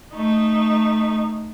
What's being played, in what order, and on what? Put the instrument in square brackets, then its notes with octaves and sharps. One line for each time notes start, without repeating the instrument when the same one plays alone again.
[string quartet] A3 D#4